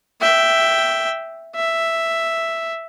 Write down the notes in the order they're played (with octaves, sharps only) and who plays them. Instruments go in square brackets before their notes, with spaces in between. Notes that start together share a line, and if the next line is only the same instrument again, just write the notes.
[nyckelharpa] E5 G5
E5